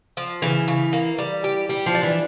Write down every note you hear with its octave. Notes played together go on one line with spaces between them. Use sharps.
F3
C#3 E3
C#3
A#3
G3
G4
G3 G4
F3
D4
E3